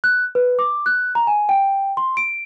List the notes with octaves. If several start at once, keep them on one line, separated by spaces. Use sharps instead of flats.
F#6
B4
D6
F#6
A#5
G#5
G5
C6
D7